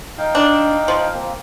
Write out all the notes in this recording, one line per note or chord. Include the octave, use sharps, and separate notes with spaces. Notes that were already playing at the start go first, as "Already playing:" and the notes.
D#4 F5 G5
D4
F3
A#3 C4